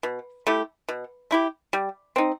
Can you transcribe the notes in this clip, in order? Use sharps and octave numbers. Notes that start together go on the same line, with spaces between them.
B2
A3 E4 G4
B2
A3 E4 G4
G3
C4 D#4